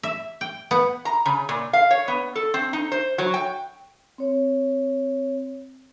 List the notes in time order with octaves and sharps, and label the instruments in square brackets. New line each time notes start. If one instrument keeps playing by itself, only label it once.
[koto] E5
G5
B3
[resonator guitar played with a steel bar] A#5
C#3
A#2
F5
C#5
B3
A4
C4
D#4
C5
F#3
G5
[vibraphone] C4 C#5